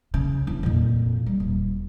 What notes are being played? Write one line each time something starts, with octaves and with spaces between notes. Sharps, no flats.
C#3
E2 D4
F2 A#2
G3
D#1